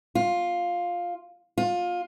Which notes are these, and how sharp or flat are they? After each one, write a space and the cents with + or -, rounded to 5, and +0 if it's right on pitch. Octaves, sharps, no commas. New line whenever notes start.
F4 +10
F4 +20